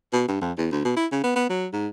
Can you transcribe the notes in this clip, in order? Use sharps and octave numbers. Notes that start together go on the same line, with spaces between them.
B2
G2
F2
E2
D2
B2
E4
C#3
B3
B3
F#3
G#2